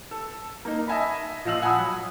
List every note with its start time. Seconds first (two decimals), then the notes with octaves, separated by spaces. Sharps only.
0.11 A4
0.65 A#3 D#4
0.87 D#5 E5 G#5 A5 B5
1.45 A#2 F3 D#5 F5 E6 F#7
1.62 F#5 G#5 A5 B5 D#6 E6
1.78 F#3